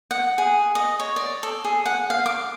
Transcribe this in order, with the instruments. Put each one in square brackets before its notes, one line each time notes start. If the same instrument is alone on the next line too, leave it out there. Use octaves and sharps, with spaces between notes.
[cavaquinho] F#5
G#4
D#5
C#5
D5
A4
G#4
F#5
F5
D6